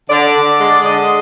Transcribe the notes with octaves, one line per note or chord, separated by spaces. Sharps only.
D3 D5
D3
G#3
D3 D#5